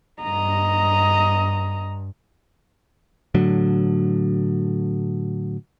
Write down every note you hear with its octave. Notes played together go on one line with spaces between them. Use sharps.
G2 D#5 A#5
A2 D3 F#3